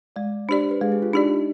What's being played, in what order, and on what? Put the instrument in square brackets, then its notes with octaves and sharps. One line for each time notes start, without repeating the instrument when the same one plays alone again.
[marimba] G#3 [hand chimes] D5
[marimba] D4 G4 D5 [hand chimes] C5
[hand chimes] B4
[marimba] G#3 [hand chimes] G#4
[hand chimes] G4
F4
[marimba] D4 G4 D5 [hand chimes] D#4